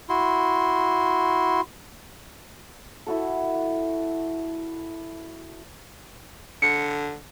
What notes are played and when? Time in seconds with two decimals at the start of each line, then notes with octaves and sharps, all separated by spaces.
0.09 E4 F#4 C6
3.07 E4 F#4 A4
6.62 D3 C#7